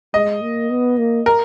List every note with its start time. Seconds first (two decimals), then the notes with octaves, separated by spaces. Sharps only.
0.14 G#3 D#5
0.42 A#3
0.70 B3
0.98 A#3
1.26 A#4